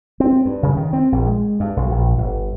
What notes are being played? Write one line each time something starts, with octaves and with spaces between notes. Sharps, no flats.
C4
G2
C#3
D#3
C4
A#1
G#3
G2
B1
A#1
G1